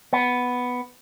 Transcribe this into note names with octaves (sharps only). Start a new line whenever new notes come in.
B3